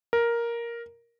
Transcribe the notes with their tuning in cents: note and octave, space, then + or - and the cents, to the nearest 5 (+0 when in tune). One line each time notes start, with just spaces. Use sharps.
A#4 +5